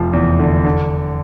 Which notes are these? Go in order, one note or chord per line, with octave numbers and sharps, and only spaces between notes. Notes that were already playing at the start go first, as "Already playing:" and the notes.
Already playing: F1 F3
E2
D3
D3